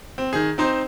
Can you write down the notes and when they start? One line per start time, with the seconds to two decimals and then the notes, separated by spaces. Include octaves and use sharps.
0.18 C4
0.33 D#3 G#4
0.58 C4 D#4 C5